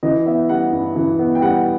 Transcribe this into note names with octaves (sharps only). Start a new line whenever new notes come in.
E3 D#5
B3 E5
G3 F#5
G2
E3
B3
G5
G3 F#5